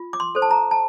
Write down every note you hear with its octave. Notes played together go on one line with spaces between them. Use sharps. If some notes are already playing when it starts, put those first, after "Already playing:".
Already playing: F4
D6
C6
A4 C5
A5
A#5
A5